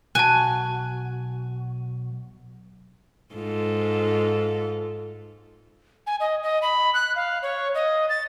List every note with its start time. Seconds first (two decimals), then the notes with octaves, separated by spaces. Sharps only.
0.15 B1 F#4 G#5 A5 F#6
3.34 G#2 F4 A4
6.07 G#5
6.20 D#5
6.43 D#5
6.62 B5
6.94 F#6
7.16 F5
7.42 C#5
7.75 D#5
8.09 A6